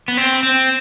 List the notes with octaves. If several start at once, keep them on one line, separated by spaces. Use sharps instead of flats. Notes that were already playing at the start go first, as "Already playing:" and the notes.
B3
C4
C4